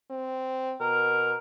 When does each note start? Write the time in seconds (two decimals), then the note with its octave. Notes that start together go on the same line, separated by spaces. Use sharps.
0.10 C4
0.80 B2 A#4